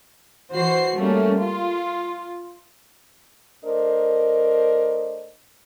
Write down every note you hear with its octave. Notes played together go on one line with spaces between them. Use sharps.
E3 F#4 C5 C7
G3 A3 A#3 C#4
F4
A3 D4 A#4 C5 D#5